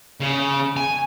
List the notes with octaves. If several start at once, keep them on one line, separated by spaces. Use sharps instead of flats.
C#3
G#5